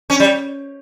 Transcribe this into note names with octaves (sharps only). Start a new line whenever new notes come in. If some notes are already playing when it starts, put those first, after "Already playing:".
C#4
G3